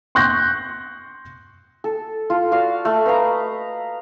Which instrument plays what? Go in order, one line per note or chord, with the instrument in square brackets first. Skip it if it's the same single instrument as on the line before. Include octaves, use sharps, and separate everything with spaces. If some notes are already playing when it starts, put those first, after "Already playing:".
[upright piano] C6 C#6 F#6 G6 A#6
[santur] A4
F4 A4
F#4 D5 F5
A3
B4 D#5 F5 A#5